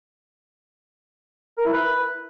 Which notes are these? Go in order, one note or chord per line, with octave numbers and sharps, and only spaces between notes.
A#4
E4
B4